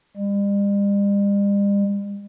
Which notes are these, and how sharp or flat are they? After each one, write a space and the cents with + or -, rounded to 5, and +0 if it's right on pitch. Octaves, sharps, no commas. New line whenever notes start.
G3 +45